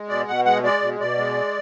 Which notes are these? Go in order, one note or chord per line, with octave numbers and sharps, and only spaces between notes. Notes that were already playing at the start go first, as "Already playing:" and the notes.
Already playing: G#3
B2 D5
B2 F#5
G#3 F#5
G#3 D5
B2
B2 D5
G#3